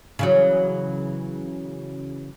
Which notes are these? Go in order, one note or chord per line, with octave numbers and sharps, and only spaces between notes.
C#3 E3 F#3